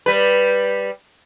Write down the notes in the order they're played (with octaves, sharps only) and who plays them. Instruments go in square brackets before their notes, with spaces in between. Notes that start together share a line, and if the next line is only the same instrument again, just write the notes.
[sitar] G3 B4